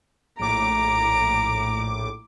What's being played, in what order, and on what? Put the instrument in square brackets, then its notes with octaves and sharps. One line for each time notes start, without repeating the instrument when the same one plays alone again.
[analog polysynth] A#1 A2 D6 [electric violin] A#5 D7